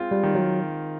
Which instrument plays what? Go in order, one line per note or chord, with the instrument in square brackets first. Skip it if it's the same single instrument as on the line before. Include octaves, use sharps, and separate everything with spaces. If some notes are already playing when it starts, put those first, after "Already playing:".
Already playing: [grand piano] G#3 C4 F4
[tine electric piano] G3
[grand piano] D#3
[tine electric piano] F#3